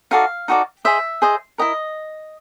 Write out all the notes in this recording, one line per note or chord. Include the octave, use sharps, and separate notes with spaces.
D#4 F#4 A4 D5 F5
D#4 F#4 A4 D5
G#4 C5 D#5 E5
G#4 C5 D#5
E4 G4 A#4 D#5